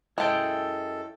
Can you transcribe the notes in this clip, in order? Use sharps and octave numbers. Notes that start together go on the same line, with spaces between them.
F#2 G#3 E4 A4 G5 A5